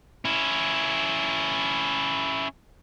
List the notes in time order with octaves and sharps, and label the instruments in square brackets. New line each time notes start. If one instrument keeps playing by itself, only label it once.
[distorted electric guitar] C#4 E4